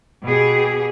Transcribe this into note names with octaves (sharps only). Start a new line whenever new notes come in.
B2 G4 G#4